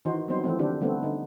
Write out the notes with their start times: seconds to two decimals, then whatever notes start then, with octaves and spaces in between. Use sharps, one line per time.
0.05 D#3 E3 D#4 F#4 C5
0.28 F#3 G3 B3 C4 D#4 C5
0.44 E3 F3 A3 C4
0.59 D3 D#3 C4 D4 G4
0.81 D3 G3 A3 B3 C4
1.03 D3 D#4